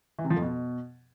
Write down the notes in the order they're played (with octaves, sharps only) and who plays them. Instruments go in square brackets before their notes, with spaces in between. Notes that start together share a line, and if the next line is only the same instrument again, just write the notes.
[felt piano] E3
C3
F3
F2
B2